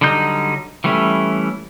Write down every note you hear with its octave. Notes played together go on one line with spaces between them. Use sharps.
D3 F#3 G3 D#4 G6
E3 G3 A3 C#4